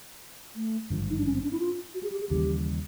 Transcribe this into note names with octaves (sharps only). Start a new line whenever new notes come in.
A3
G#1 G2 D3 F3
D#4
D4
C#4
C4
D4
E4
F4
F#4
G#4
G4
G#4
D#2 C#3 E3 G3 G4